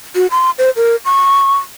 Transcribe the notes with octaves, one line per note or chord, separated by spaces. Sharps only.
F#4
C6
C5
A#4
C#6